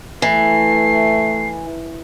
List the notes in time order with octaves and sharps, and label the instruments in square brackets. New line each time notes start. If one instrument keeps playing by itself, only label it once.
[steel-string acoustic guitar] E3 [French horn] A3 [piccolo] C7